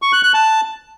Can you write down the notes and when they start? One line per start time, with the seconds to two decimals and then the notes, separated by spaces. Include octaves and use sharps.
0.02 C#6
0.13 F#6
0.23 F#6
0.34 A5